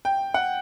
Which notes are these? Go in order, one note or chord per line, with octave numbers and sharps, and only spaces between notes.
G5
F#5